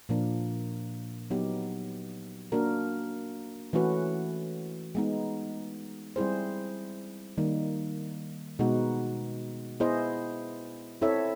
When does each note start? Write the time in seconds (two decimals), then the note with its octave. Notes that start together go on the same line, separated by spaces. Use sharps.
0.09 A#2 F3 A#3 D4
1.30 F#3 B3 D#4 G4
2.52 A#3 D4 F#4 A#4
3.73 E3 A3 C#4 F#4 B4
4.95 G#3 B3 D#4
6.16 G3 C4 E4 G#4 C5
7.38 D#3 G3 A#3 D#4
8.59 B2 G#3 B3 D#4 F#4
9.80 B3 E4 G#4 C5 D#5
11.01 C4 E4 A4 C#5 E5